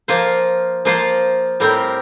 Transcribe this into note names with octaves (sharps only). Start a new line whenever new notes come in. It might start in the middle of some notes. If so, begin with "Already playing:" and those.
F3 A#3 F4 C5
F3 A#3 F4 C5
A2 G3 C4 G4 A#4